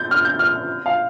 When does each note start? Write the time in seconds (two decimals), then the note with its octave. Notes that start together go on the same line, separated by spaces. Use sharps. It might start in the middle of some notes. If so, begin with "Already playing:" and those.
Already playing: G6 A6
0.11 F6
0.25 G6
0.39 F6
0.86 F5